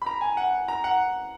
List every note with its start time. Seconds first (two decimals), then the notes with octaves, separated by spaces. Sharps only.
0.02 B5
0.06 A#5
0.21 G#5
0.37 F#5
0.68 A#5
0.84 F#5